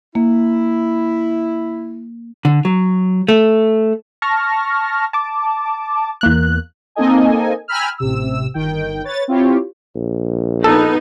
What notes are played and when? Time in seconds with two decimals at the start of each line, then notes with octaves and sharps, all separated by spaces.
0.15 A#3 E4
2.45 D3
2.65 F#3
3.28 A3
4.22 A5 C#6 F6 A#6
5.13 A5 D6
6.21 E2 A#3 F#6
6.95 A#3 C4 D#4 A4 D#5 G#5
7.68 G5 G#5 A#5 B5 E6 F6
7.98 A1 C3 E6
8.54 G1 D#3 G5
9.04 B4 C#5 A6
9.28 C4 E4 F4 G4 C#5
9.95 A#1
10.64 B3 D#4 A4